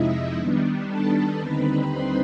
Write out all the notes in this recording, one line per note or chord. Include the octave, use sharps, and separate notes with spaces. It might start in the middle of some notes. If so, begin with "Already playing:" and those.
Already playing: F2 C3 F3 G#3 D#4 E4 D#5 E5
D#3 G3 B3 D4
A4 A5
D#2 D3 G3 C4 D#4 B4 B5
C5 C6